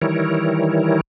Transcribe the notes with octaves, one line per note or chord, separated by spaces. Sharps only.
D#3 E3 G3 E4 A#4 C#5